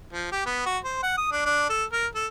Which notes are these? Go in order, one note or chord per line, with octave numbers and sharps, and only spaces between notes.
F3
G4
B3
F#4
C5
F#5
D#6
D4
D4
A4
A#4
A4